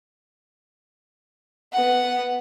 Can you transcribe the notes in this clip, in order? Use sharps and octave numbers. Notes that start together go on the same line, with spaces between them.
B3 F#5